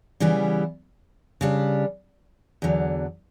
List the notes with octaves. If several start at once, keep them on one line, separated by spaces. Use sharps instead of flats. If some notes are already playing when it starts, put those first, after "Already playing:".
C#3 E3 G3 B3 E4
C#3 G3 D4
E2 D3 F#3